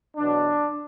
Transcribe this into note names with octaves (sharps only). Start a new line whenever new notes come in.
E2 B2 F#3 D4